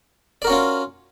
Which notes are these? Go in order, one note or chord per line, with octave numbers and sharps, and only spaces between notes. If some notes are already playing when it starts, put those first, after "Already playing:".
C#4 F4 F#4 A#4 D5